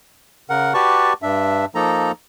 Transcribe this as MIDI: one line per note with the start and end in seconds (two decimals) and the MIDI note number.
0.50 0.73 49
0.50 0.73 70
0.50 0.73 78
0.74 1.13 66
0.74 1.13 67
0.74 1.13 71
0.74 1.13 74
0.74 1.13 81
0.74 1.13 85
1.22 1.65 43
1.22 1.65 62
1.22 1.65 76
1.75 2.12 53
1.75 2.12 58
1.75 2.12 63
1.75 2.12 69
1.75 2.12 82